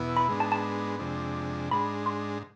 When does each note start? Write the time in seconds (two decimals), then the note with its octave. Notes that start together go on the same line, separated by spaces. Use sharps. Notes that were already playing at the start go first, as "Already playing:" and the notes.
Already playing: E2 B2 B3 E4
0.17 B5
0.28 G#2 G#3 B3 D4
0.40 A5
0.52 A5
0.99 F2 C3 G#3 D4
1.71 G#2 G#3 D4 B5
2.06 C6